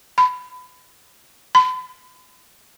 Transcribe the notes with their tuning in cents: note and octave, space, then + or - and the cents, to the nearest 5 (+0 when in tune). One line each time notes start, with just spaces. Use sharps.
B5 +25
B5 +45